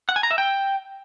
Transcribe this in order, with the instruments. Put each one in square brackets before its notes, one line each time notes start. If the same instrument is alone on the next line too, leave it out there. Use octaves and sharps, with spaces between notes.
[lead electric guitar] F#5
G#5
A#5
E5
G5